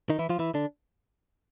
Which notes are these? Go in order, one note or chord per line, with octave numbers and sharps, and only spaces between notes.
D#3 D#4
E3 E4
F3 F4
E3 E4
D3 D4